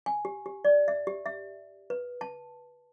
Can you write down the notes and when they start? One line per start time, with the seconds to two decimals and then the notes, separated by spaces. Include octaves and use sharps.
0.06 G#5
0.25 G4
0.46 G4
0.65 D5
0.88 E5
1.07 G4
1.26 E5
1.90 B4
2.21 A5